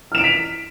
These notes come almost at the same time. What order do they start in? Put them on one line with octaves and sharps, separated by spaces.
F6 E7 D7 F7 B6